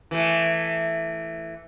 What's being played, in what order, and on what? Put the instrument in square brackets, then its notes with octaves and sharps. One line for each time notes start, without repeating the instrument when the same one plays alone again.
[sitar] E3 A3